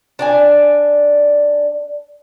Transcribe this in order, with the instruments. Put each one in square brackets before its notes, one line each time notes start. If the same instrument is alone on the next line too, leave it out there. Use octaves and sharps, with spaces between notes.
[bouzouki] D4 D5 G#5